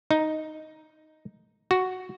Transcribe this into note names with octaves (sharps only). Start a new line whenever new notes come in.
D#4
F#4